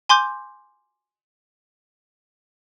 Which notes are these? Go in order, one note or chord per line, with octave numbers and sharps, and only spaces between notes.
G#5 C6 D6 G6